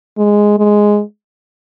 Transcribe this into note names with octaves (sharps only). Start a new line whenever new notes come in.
G#3
G#3